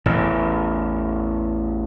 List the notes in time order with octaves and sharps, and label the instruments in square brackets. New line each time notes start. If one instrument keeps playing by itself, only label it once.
[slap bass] A1 E2